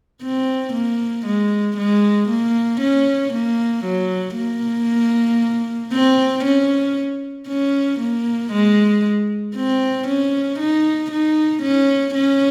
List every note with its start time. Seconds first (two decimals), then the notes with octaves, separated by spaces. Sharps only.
0.23 C4
0.73 A#3
1.26 G#3
1.77 G#3
2.29 A#3
2.81 C#4
3.33 A#3
3.85 F#3
4.36 A#3
5.93 C4
6.44 C#4
7.48 C#4
8.00 A#3
8.52 G#3
9.56 C4
10.08 C#4
10.59 D#4
11.11 D#4
11.63 C#4
12.14 C#4